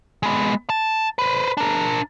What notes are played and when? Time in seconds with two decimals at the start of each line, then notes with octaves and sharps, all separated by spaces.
0.23 G#3 B3
0.70 A5
1.19 B4 C5
1.57 D4 A#4